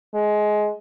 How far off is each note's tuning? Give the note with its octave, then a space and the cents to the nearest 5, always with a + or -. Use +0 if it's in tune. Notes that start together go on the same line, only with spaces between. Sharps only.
G#3 +15